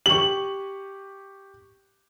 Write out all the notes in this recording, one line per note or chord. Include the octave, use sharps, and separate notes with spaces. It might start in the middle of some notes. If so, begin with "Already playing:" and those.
G4 C#6 F#7